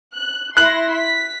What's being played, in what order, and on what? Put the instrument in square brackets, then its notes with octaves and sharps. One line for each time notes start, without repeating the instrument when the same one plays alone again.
[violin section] F#6
[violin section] E4 C6 A#6 [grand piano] F#6 F#7
[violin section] B6